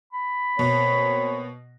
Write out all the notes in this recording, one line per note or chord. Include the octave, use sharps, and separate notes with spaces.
B5
B2 A#3 C4 C#5